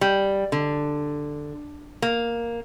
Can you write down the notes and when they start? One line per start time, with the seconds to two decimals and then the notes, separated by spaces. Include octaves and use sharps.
0.01 G3
0.52 D3
2.02 A#3